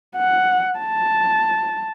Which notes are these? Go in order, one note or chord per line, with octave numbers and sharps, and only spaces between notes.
F#5
A5